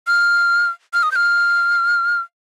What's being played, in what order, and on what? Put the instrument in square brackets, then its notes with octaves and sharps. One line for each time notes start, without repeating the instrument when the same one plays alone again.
[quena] F6
F6
D#6
G6
F6